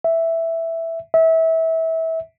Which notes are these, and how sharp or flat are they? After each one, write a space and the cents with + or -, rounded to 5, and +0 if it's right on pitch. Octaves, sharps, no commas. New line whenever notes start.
E5 +0
E5 -25